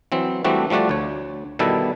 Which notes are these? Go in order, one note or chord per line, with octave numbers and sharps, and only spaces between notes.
E3 F#3 C4
E3 G3 A3 C4 D4 F#4
F3 G3 A3 F#4 D5
D2 C#5
B2 D#3 G3 E4 A4